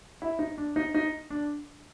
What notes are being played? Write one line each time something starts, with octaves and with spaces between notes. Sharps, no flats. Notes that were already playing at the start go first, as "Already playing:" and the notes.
E4
D#4
D4
D#4
D#4
D4